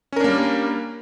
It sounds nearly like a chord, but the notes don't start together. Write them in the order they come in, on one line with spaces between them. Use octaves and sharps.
C#4 A#4 D4 A#3 G3